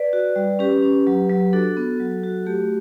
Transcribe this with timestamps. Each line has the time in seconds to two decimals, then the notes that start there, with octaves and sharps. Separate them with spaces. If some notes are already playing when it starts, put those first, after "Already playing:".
Already playing: B4 D5
0.13 F#4
0.36 G3
0.59 C#4 G4 B4
0.82 C#4
1.07 F#3
1.29 F#3
1.53 D4 F#4 A4
1.77 B3
2.00 F#3
2.23 F#4
2.46 A3 G4